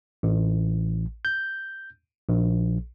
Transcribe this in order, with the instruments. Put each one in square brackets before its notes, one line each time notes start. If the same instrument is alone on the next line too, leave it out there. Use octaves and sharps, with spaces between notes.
[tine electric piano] A1
G6
A#1